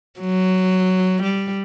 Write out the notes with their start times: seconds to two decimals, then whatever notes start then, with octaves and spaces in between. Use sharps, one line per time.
0.20 F#3
1.23 G3